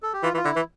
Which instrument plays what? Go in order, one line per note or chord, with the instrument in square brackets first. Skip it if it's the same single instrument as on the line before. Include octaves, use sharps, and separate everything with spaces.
[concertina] A4
G4
[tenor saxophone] E3 [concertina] F4
[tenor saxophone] E3 [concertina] F4
[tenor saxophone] D3 [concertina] E4
[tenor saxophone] E3